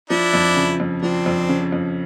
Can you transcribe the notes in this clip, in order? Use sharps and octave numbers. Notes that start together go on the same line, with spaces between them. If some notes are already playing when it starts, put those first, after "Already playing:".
F3 D4 E4
F2
C#3
F2
F3 C4 D4
F2
C#3
F2